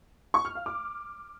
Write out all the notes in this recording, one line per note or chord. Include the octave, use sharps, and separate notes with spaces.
C#6
F6
F5
D6